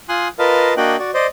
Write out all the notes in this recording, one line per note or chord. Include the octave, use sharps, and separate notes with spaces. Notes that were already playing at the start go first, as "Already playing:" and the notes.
F4 G#5 C6 D#6 F#6
F4 A#4 B4 D#5 F5 A5
A#3 D4 F#4 D#5 G5 F#6
F#4 D5
C5 D5 D#5